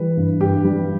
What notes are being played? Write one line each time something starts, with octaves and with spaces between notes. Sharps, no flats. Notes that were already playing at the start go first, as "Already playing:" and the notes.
Already playing: E3 G3 B4
G2
G2 G4
G3